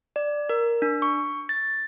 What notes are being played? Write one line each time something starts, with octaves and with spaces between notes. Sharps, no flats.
D5
A#4
D4
C#6
A6